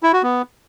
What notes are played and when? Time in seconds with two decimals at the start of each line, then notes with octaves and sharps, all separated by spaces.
0.03 E4
0.13 F#4
0.23 B3